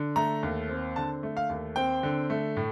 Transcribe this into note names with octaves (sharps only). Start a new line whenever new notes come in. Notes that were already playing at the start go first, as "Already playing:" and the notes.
Already playing: D3
A3 A#5
D#2
C4
D3 A5
A3
F5
D#2
C4 G5
D3
A3
A2